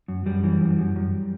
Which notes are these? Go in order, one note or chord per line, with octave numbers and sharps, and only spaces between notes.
F#2
F#2 G3
E3
F#2
F#2
F#2